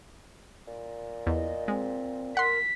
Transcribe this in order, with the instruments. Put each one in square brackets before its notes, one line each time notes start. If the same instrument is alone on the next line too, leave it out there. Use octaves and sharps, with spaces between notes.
[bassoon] A#2
[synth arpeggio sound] E2 [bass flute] D#5
[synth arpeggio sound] G#3 [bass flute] C4
[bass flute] A#4 [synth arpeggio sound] F#5 C6 [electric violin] B6